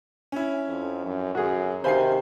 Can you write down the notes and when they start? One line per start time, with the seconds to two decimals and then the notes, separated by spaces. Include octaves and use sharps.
0.32 C#4 E4
0.68 F2
1.05 F#2
1.35 F#2 F#4 G#4
1.84 C3 D#3 C5 F5 G#5 B5 C7